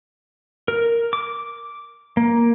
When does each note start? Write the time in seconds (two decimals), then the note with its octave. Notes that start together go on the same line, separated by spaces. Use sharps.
0.68 A#4
1.13 D6
2.17 A#3